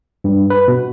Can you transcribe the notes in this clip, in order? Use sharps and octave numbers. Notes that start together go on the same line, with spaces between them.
G2
B4
B2